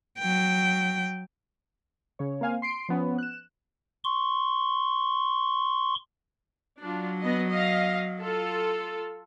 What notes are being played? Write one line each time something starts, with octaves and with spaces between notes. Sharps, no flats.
F#3 G5
C#3 C#5
A#3 C4 F5 G#5
C6 C7 D7
F3 B3 C#4
F#6 E7
C6 C#6
F#3 D4 F4
B3 D#5
D#5 F5
F4 A4